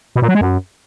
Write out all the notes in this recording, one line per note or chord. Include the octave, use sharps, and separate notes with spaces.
B2
A#2
F#3
G#3
F#2